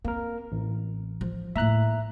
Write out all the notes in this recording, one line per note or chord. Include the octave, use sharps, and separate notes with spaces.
A#3 C4 A#4
A1
F3
A2 A#3 E5 A#5 F#6